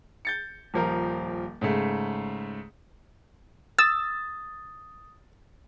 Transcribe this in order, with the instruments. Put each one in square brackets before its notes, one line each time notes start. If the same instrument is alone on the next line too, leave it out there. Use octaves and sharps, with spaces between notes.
[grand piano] G6 A6 C#7
D#1 F3 A#4
G#2 C#3 A3
[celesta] D#6 [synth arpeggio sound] E6 [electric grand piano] A6